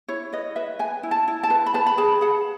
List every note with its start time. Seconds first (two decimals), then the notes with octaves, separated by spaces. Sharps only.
0.08 E4 C#5
0.33 B4 D#5
0.56 B4 E5
0.79 B4 G#5
1.03 E4
1.11 A5
1.28 E4
1.43 A5
1.50 B4
1.66 B5
1.74 B4 A5
1.86 B5
1.97 G#4 A5
2.21 G#4 F#5